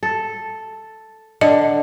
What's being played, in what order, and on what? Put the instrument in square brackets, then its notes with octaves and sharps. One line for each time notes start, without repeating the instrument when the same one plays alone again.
[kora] A4
[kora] D3 [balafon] D#5